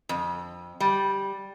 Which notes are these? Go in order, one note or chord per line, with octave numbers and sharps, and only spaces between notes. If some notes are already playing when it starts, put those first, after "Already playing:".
F2
G3